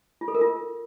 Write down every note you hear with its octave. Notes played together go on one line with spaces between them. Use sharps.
F4
A4
A#4
F4